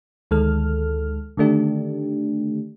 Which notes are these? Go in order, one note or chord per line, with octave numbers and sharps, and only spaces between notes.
D2 D#3 G#3 A4 F6
D3 D#3 A3 D4 G4